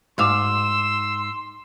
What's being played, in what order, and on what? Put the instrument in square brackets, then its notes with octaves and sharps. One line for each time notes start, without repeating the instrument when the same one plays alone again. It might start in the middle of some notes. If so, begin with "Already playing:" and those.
[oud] G#2 F5 [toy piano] F#4 D6 [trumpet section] C6 [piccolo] E6